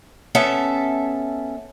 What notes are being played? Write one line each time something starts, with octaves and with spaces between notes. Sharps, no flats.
B3 C#4 A4 E5 A5